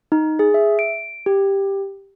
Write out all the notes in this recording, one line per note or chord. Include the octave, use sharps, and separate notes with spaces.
D#4
G#4
E5
D7
G4